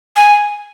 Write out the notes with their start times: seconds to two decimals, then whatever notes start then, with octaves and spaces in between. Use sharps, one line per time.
0.16 G#5